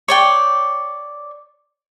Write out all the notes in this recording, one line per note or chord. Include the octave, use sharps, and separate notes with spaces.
C#5 D5 G5